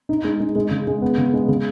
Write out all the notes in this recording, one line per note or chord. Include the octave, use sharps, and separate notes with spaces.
D#4
G#3
G#3
G#3
C#3
G#3
B3
C#3
G#3
C#3